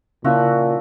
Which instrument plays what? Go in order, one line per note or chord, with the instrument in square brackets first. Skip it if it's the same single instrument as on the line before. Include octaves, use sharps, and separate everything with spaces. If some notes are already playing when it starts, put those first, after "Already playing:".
[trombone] A#2 [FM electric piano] C#3 C#4 E4 [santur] F3 F#4 E5